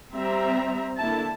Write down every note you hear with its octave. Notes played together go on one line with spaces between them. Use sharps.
G3 C4 E5 A#5
D3 A#3 E4 A5